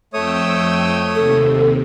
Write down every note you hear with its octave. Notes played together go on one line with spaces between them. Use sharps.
F2 A3 C#5 G5 D#6 E6
D#2 C3 A4